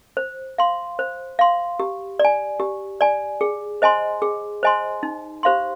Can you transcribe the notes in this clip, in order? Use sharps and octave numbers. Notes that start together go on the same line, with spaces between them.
C5
F5 C6
C5
F5 C6
G4
D5
G#5
G4
D5 G#5
G#4
C5 D#5 G#5 C6
G#4
C5 D#5 G#5 C6
D#4
G4 C5 F5 C6